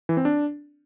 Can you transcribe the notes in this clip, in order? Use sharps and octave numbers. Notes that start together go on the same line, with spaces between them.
E3
C4
D4